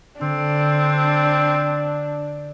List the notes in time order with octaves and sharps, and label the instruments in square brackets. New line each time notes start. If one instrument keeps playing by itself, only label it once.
[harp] D3 [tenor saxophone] C4 [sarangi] D4